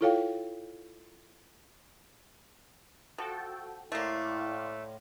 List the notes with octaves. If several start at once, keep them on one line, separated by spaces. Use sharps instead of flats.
E4 F4 A4 C#5 F5 G5
F3 F#4 A4 G5
A2 A3 A#3 E4 D5 F5 C6